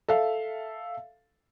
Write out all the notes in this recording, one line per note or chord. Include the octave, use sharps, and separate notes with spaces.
A4 E5 F5